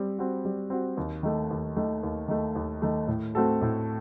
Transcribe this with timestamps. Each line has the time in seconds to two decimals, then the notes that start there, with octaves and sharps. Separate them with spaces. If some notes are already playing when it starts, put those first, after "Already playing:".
Already playing: G3 C4
0.18 C4 F#4
0.45 G3
0.70 C4 F#4
0.97 D#2
1.23 D#3 A3
1.50 D#2
1.76 D#3 A3
2.03 D#2
2.28 D#3 A3
2.55 D#2
2.82 D#3 A3
3.08 A2
3.35 A3 C4 F#4 A4
3.61 A2